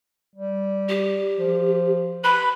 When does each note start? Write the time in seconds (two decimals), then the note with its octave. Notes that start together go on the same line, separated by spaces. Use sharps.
0.36 G3
0.89 G4
1.39 F3
2.24 B4 B5